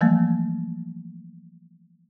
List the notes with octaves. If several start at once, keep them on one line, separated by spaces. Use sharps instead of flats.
E3 F3 G3 A3 A#3